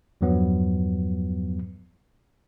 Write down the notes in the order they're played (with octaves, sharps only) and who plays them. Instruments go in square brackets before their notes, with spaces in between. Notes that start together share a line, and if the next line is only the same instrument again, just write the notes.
[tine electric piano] E2 G2 F3 F#3 B3